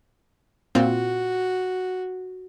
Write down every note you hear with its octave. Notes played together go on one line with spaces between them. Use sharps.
A#2 C4 F4 F#4